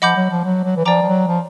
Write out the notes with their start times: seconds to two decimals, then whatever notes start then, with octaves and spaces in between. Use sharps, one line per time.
0.02 F3 D#5 F#5 B5 D6 G6
0.16 F#3
0.30 F3
0.44 F#3
0.64 F#3
0.77 E3
0.85 F3 D5 G5 A#5 D6
1.03 F3
1.06 F#3
1.27 F3